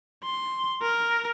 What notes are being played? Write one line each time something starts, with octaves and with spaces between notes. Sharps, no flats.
C6
A#4